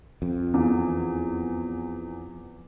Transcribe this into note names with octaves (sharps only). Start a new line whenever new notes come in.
F2
E2